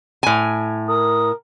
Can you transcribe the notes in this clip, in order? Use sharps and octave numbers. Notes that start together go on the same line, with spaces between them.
A2 G#5
A#4 D#6